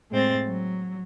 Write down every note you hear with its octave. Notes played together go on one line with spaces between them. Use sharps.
A2 G#3 C4 A6
F#3